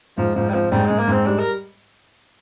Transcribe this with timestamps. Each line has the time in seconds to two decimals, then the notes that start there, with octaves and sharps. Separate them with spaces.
0.18 G#2 F3
0.35 G#2 F3
0.50 G3
0.54 F3 C4
0.71 G#2 G3
0.86 G#2 G#3
0.99 A#3
1.08 G#2 C4
1.26 G3 D4
1.39 A#4